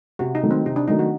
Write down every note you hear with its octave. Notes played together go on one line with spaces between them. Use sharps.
C3 F#4
D#4
D#3 F#3 A3
C4
C3 D#4
D4
D#3 F#3 A3 D#4
F#4